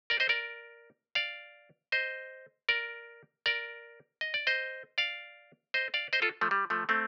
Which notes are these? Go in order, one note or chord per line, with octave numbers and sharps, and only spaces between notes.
A#4 D5
C5 D#5
A#4 D5
D5 F5
C5 D#5
A#4 D5
A#4 D5
D#5
D5
C5 D#5
D5 F5
C5 D#5
D5 F5
C5 D#5
F4 A4
F3 A3
G3
F3 A3
A3 C4